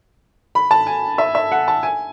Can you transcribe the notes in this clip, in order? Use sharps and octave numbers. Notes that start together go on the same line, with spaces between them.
B5
A5
G#5
E5
E5
F#5
A5
G#5